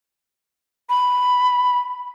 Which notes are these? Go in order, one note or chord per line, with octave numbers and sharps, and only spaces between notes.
B5